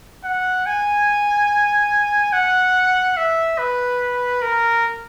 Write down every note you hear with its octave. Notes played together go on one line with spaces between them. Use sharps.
F#5
G#5
F#5
E5
B4
A#4